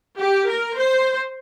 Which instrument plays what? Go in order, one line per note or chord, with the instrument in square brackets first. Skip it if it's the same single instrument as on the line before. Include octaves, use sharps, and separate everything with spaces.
[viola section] G4
A#4
C5